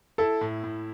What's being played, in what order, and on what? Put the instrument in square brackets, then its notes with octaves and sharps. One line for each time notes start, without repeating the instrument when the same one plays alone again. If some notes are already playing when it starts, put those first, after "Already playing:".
[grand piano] E4 [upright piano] A4
[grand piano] A2
A2